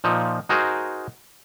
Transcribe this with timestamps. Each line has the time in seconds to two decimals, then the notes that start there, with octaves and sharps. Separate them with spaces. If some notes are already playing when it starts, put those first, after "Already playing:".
0.04 A#2 F3 D#4
0.49 D#4 F#4 G#4 A#4 C5